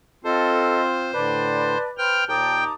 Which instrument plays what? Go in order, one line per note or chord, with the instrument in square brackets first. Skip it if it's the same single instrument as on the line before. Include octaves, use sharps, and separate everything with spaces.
[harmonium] C4 F4 [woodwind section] A4 [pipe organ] C5 [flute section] D#5
[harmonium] A2 D3 [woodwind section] B4 D5 [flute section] A5
[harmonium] B4 C5 [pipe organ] G5 F6
[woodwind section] D#2 A5 [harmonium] A#2 [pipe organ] G5 [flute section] A#5 D6 D#6